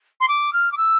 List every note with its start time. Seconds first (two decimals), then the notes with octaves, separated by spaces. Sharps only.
0.20 C6
0.28 D6
0.53 F6
0.72 D6
0.77 E6